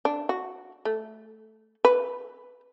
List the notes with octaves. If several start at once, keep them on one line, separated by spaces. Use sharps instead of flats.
D4
F#4
A3
B4